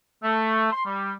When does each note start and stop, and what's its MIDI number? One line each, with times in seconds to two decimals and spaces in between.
0.23 0.68 57
0.71 0.80 84
0.85 1.11 55